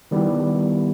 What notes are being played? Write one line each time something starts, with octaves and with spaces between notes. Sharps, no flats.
D#3 G3 B3 E4 G4